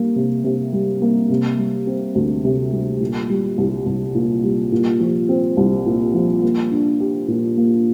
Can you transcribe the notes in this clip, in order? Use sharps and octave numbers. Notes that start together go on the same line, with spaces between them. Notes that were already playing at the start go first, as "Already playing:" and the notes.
Already playing: G3 A#3
C3
C3
G3
A#3
C3
G3
C4
D2
C3
G3
A#2
G3
C2
C2
A#2
G3
A#2
F3
C4
C2
A#2
F3
A#3
D4
G4
A#2
A#3